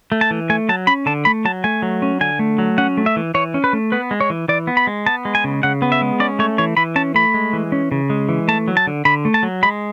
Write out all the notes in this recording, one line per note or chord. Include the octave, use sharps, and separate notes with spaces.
A3
A5
E3
A3 G#5
F#3 A5
C#4 B5
D3 A5
A3 B5
F#3 A5
A3 G#5
F#3
C#4
D3 G#5
A3
F#3
C#4 F#5
A3
E5
E3
E3 C#5
C#4
B4
A3
B3 B4
G#3
C#5
E3
E3 D5
B3
B5
G#3
B3 A5
G#3
G#5
C#3
C#3 F#5
B3
E5
G#3
C#4 D5
A3 C#5
E3 C#5
E3 B5
C#4 A5
A3 B5
G#3
E3
C#4
C#3
G#3
E3
A3 A5
F#3
A5
D3
D3 B5
A3
A5
F#3
G#3 B5